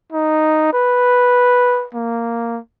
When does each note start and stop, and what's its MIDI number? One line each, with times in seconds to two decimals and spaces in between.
0.13 0.72 63
0.73 1.86 71
1.94 2.59 58